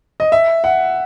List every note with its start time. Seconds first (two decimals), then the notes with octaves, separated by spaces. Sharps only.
0.20 D#5
0.32 E5
0.64 F#5